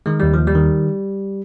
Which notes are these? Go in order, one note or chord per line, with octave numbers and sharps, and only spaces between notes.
D#3 G#3
D#2 G3
F3
D#2
G3
D#3